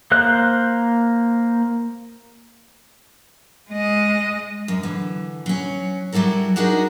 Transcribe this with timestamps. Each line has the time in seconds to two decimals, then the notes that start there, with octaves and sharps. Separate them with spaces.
0.11 A#3 C5 F#6
3.70 G#3 D#5
4.68 F#2
4.83 D3 E3
5.46 F#3 C#4
6.12 F#3 G3 E4 A4 A#4
6.56 D4 D#4 F#4 G#4 A#4